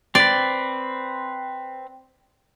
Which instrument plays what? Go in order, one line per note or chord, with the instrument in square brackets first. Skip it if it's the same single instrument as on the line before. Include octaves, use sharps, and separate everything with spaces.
[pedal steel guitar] C4 B4 [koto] D5